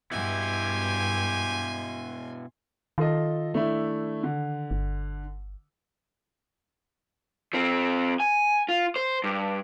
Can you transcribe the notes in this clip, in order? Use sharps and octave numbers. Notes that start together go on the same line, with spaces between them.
G2 B2 E4 F#4 G4 G#5 C6
D#3 F4 A4 D#5
A3 D4 E4
D3
G1
F3 C4
G#5
F4
C5
G2